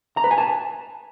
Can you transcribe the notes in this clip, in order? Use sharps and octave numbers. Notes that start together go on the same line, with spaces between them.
A#5
B4
G#5
A5